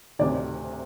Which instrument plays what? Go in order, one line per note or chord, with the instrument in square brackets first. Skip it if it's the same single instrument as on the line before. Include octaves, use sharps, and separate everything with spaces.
[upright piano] D2 C3 D#3 D5